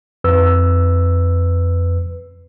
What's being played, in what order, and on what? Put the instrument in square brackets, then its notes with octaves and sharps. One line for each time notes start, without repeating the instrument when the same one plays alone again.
[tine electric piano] F2 B4 E6